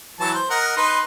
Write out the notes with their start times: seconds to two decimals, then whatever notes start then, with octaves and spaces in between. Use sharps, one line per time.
0.20 E3 F#3 A5
0.34 C5
0.51 A#4 D#5 F#5
0.77 D#4 B4 C6